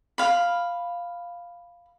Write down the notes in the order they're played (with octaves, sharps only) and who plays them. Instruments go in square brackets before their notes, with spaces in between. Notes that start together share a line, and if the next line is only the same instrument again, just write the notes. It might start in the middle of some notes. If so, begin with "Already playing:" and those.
[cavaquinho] F5 B5